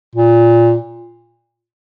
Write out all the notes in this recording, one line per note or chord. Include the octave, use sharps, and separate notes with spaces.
A#2